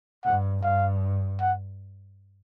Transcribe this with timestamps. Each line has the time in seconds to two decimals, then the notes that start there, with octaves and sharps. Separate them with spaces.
0.25 G2 F#5
0.63 G2 F5
1.41 F#5